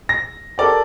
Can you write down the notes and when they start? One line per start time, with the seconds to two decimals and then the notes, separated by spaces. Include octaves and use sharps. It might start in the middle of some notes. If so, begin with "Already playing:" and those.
0.09 A#6
0.58 G4 A4 A#4 D5 G5